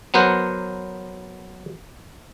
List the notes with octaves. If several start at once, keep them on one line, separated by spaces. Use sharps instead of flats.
F#3 B3 A#4 C5 F#5